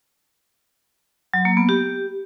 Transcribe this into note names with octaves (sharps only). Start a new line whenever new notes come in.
F#3
A#3
B3
G4